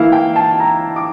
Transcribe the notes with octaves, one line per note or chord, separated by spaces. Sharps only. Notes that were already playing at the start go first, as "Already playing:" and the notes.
Already playing: E3 A#3 E4 F5
G5
A5
A#5
D6